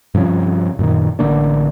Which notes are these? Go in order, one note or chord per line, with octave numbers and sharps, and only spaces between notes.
G2 C3 F3 C#4
F#2 A#2 D3 D#3
A1 D3 A#3 D4